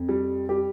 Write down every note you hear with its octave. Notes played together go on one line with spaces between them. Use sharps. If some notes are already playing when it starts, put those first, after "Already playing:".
Already playing: F2
G3
G3 G4